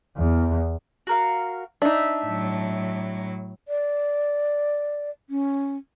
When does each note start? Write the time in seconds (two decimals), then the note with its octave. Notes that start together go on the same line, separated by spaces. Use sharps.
0.16 E2
1.07 F#4 A#4 F5
1.82 D4 D#4 E5
2.26 A2 F#3
3.68 D5
5.30 C#4